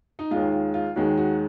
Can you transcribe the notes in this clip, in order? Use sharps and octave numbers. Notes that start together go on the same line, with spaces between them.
D#4
D#2 D#3 G#3 F4
F4
F4
D#2 D#3 G#3 F#4
F#4